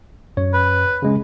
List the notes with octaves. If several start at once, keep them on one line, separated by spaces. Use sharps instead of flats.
F#2 C#5
B4
C#3 G#3 C#4